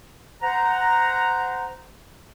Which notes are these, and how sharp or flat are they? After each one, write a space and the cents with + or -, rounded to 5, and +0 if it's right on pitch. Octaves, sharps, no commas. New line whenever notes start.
C5 -25 F#5 +0 A#5 +0